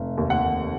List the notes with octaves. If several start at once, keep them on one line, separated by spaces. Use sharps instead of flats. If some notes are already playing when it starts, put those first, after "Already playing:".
Already playing: F1
D#2
F#5
F1